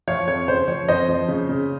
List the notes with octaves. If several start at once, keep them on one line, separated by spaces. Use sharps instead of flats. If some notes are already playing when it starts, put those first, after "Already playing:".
F3 C#5 F5
F2 C#5
C#3 C5
F3 C#5
F2 C5 D#5
F3
C#3
C#3